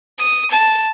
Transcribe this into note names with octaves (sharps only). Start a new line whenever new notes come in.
D#6
A5